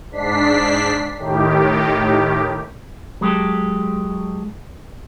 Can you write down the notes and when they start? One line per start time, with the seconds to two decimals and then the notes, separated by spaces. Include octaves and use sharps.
0.10 G#2 D4 B6 C7
1.17 A2 D#3 G4
3.21 F#3 G#3 G4 A4